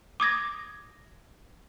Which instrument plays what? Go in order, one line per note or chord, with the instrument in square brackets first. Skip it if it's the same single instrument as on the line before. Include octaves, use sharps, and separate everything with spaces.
[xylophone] D6 D#6 G#6 A#6